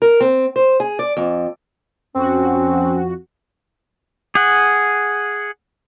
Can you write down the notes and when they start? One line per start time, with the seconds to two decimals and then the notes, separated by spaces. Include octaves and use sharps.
0.02 A#4
0.20 C4
0.56 C5
0.80 G#4
0.99 D5
1.17 F2
2.15 F2 C4 C#4 F#4
4.35 G#4 F#5